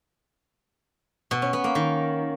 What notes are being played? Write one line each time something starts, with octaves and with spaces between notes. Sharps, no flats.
B2
C#4
B3
A#3
D#3